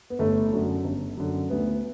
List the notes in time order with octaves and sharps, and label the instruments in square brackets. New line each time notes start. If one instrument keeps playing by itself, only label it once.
[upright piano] B3
G1 A3
F#2 D3
G1
F#2 D3
D2 B3